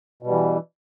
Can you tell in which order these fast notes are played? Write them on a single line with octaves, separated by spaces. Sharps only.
B2 G3 E3